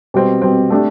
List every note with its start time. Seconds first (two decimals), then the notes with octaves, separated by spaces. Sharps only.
0.14 B2 G3 C4
0.42 B2 G3 C4
0.70 A3 D4 G4